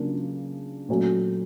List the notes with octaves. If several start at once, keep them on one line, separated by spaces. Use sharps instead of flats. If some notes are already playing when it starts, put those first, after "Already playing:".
Already playing: C#3 F#3 A#3 D4 F4
A#2 F#3 A3 C#4